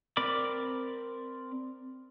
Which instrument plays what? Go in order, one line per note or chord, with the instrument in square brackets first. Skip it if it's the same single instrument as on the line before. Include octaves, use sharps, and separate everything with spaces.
[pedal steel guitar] C4 A#4 D5 B5 D6